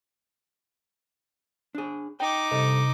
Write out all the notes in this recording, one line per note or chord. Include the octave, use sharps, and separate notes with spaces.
D4 G#4
D#4 G5 D6
G2 C3 A4 D#5